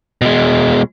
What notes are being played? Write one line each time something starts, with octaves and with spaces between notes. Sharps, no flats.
B2 G#3